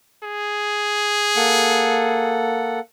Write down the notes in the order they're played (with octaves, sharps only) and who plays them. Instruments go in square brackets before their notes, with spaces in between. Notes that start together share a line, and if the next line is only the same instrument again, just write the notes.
[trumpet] G#4
[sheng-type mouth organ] A#3 A4 F#5